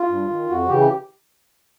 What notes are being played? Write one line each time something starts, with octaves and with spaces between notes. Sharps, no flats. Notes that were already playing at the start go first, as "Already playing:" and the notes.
Already playing: F4
G2
D#3
F2 F#4
C#3 E3 G4